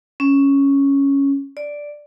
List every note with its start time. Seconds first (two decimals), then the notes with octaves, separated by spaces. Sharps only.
0.20 C#4
1.57 D5